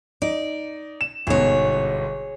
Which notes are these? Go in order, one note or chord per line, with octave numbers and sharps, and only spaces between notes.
D#4 D5
E7
G1 G#2 B2 G#4 C#5